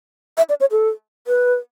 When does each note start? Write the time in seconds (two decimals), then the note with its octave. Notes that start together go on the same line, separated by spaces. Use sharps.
0.37 E5
0.49 D5
0.60 C#5
0.71 A4
1.27 B4